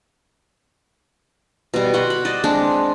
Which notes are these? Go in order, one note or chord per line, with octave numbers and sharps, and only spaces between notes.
B2 G3
F#4 F#5 C6
B5
C5 D5 D#5
G#3 C4 D4